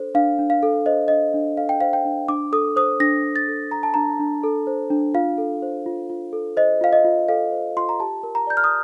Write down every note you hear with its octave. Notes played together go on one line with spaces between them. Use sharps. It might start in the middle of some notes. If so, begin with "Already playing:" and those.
Already playing: D4 A4 C5
D4 F5
D4
F5
A4
C5 D#5
D4 D#5
D4
A4 F5
G5
C5 F5
G5
D4
D4 D6
A4 D#6
C5 D#6
D4 A#6
D4
A6
A4
C5 A#5
A5
D4 A#5
D4
A4
C5
D4
F4 F5
A4
C5
F4
F4
A4
C5 D#5
F4 F5
D#5
F4
A4 F5
C5
F4 C6
A#5
G4 A5
A#4
A#5
D5 G6
F6
D#6